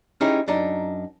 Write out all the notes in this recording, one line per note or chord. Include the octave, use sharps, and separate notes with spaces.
C#4 D#4 E4 G4 G#4
F#2 D4 D#4